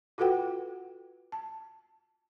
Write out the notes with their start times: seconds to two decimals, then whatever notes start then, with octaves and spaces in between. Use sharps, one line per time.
0.18 F4 F#4 A4 B4 F#5 G5
1.32 A5